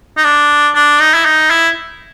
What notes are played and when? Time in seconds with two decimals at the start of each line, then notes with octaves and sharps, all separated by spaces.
0.18 D#4
0.25 D4
0.75 D4
1.00 D#4
1.15 E4
1.25 D#4
1.50 E4